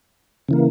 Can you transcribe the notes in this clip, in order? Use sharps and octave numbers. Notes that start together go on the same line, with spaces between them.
C#3 E3 A#3